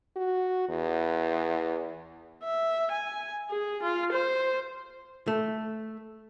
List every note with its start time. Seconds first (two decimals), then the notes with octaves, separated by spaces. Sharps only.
0.16 F#4
0.69 E2
2.43 E5
2.91 G#5
3.50 G#4
3.82 F4
4.12 C5
5.28 A3